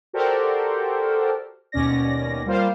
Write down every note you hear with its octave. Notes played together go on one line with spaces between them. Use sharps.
F#4 G4 A4 A#4 C5 D5
D#2 B2 C#4 D5 A#6
G3 A#3 F4 C5 F5